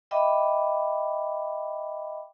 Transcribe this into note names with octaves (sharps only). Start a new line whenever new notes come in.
D#5 E5 G5 B5 D6